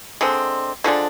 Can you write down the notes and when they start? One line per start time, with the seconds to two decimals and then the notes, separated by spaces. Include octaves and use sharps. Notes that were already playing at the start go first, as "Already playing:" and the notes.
0.21 D3 G#3 C4
0.84 D3 F3 G#3 D4